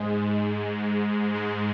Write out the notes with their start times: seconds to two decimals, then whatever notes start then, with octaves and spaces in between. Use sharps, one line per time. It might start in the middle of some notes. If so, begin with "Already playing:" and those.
Already playing: G#2 G#3
1.35 G#2 G#3